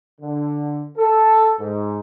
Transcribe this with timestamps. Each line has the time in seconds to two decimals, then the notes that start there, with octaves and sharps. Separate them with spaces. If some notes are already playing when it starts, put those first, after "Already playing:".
0.21 D3
0.98 A4
1.60 G#2